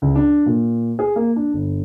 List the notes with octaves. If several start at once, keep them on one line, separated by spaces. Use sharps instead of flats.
C#2
D4
A#2
G#4
A#3
D4
G1